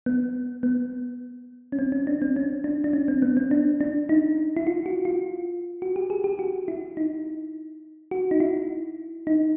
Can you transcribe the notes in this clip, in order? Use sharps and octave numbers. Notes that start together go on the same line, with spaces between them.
B3
B3
C#4
C4
C#4
D4
C4
C#4
D4
D4
C#4
C4
B3
C4
D4
D4
D#4
E4
F4
F#4
F4
F#4
G4
G#4
G4
F#4
E4
D#4
F#4
D#4
E4
D#4